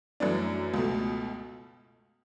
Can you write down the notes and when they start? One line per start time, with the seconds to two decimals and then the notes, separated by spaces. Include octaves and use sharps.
0.20 F#2 E3 A3 D4
0.74 C#2 B2 A3